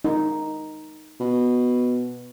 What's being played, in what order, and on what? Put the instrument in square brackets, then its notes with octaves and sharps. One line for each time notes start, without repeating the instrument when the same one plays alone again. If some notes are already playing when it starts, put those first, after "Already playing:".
[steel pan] D#4
[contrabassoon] B2